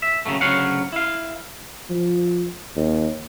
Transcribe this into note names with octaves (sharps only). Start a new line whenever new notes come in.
E5
D#2 C#3 F#3 A3
D2 C#3 F#3 C#5 F5 F#5
E4 F5
F3
D#2